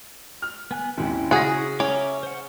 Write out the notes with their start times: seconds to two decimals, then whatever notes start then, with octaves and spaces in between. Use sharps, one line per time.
0.42 F6
0.71 B3 G#5 F#6
0.98 G#1 D#2 C#4 E4
1.31 C#3 F#4 G#4 A#6
1.80 C#4 E5 A#5 D6
2.23 C5 F#5